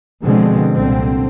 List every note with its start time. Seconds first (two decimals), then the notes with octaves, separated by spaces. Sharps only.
0.25 B2 D3 F3 G#3 C4
0.72 C2 A#2 D3 C4